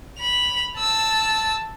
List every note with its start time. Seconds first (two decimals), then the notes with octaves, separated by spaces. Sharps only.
0.19 B5 F7
0.78 A5 E6